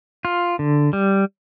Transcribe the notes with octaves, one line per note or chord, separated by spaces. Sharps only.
F4
D3
G3